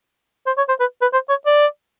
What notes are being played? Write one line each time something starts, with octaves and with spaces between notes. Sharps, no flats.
C5
C#5
C5
B4
B4
C5
C#5
D5